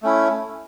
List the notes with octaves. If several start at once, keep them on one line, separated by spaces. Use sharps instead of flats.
A3 C#4 E4